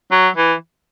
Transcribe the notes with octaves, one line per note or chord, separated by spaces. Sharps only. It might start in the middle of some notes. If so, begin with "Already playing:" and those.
F#3
E3